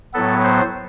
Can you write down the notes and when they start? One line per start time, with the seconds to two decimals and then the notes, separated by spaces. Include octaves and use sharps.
0.14 A2 F#3 B3 A4
0.44 C5